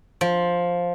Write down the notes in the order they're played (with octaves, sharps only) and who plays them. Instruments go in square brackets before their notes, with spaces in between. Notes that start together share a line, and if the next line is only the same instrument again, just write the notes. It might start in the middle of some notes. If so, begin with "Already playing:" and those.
[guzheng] F3